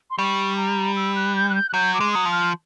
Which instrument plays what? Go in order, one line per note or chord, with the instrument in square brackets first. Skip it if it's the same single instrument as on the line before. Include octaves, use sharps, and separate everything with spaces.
[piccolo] C6
[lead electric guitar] G3 [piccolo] C#6
[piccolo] A#5
E6
F#6
G6
F#6
G6
F#6
[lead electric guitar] F#3 [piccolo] G6
[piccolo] D6
[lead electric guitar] G#3
[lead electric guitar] F#3 [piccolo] D#6
[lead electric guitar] F3
[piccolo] F6